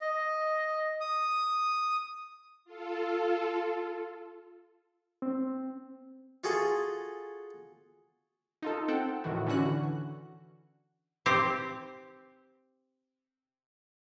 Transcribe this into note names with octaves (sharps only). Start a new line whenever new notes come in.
D#5
D#6
F4 A4
C4
F4 F#4 G#4 A4
D#4 F4 A4
C4 A4 F#5 G5 A5
A2 D#3 E3 F#4
D3 E3 C#4 F#4 F#6
C4 G4